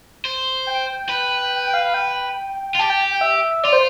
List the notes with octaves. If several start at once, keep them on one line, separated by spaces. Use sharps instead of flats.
C5
G5
B4
G5
F5
F5
G5
F4
G4 A5
G5
G5
E5
F4 D5
C5